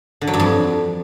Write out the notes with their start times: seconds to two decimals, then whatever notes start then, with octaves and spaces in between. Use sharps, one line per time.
0.21 D3
0.27 F#3
0.34 G2
0.40 F2